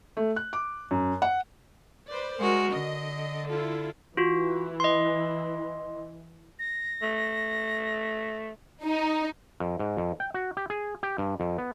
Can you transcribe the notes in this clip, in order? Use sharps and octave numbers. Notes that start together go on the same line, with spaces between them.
A3
F#6
D6
F#2
F#5
B4 C5 D5
G#3 F#4 A#4
D3 D#5
E4 F4 A4
E3 F4 F#4
D#5 C6
A#6
A3
D#4
F2
G#2
F2
G5
F#4
G4
G#4
G4
G2
F2
B3